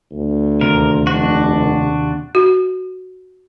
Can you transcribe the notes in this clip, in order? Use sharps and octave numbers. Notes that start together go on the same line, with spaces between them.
D2
D#2 C3 A#4
F1 D4 F#4
F#4